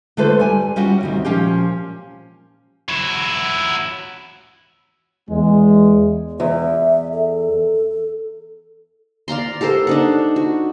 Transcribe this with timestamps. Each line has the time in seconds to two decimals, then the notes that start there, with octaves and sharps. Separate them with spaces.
0.17 D3 A3 F4 A4 B4 C5
0.40 G3 G#5
0.76 G3 C#4 F4 F#4
1.01 D2 C3 D#3
1.25 A#2 F3 C#4 F4 G4
2.89 F#3 E4
5.30 E2 G#3
6.40 E2 E5
7.12 A4
9.28 D5 F5 A#5 C6
9.61 G4 A4 A#4 C5
9.87 D4 D#4 F#5
10.36 F#4